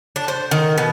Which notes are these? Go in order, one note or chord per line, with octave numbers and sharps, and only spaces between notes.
D4
C5
D#3
B2